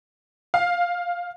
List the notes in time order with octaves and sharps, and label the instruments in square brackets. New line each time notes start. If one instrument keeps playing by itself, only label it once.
[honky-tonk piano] F5